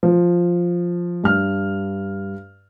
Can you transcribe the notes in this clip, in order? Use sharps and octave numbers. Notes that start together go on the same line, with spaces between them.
F3
G2 F6